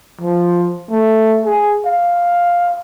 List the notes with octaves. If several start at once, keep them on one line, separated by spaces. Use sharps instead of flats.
F3
A3
G#4
F5